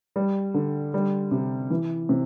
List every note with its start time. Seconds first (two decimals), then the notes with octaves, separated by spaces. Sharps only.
0.16 G3
0.54 D3
0.94 G3
1.31 C3
1.70 E3
2.09 C3